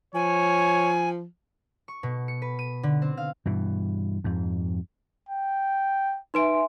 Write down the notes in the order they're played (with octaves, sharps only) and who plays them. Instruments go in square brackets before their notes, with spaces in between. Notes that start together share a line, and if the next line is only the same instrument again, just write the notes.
[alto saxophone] F3 [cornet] C#5 [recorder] G#5
[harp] C#6
B2
C#7
B4
D#7
D3
C4
F5
[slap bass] G2 B2 E3
F2 G#2
[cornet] G5
[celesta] D#4 B4 D7 [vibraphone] E5 G#5 C6